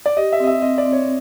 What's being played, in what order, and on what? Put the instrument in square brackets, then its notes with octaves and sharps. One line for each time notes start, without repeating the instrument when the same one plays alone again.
[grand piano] D5
[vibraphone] G4 [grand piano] D#5
[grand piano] E5
[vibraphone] C4 [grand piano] D#5
[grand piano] E5
[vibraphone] C4 [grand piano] D#5
[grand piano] D5
[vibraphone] C4
[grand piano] C#5